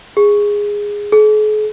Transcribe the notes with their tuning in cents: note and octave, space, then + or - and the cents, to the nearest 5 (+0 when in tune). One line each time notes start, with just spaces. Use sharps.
G#4 -10
G#4 +45